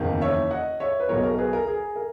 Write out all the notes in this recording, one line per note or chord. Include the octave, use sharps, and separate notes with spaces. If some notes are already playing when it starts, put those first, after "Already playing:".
Already playing: F#1 E2 D#3 A#3
C#5 E5
D#5 F#5
C#5 E5
B4
B1 B2 F#3 A#4 C#5
A#4
G#4 B4
A#4
G#4
A#4